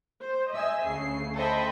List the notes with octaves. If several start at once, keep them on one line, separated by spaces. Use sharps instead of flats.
C5
D#5 E5 G#5 E6
D2 C#3 C7
A4 C5 D#5 E5 G5 B5